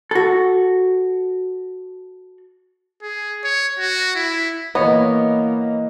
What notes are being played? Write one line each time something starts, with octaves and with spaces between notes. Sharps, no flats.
F#4 A4
G#4
C#5
F#4
E4
E3 A#3 B3 B4 C#5 D#5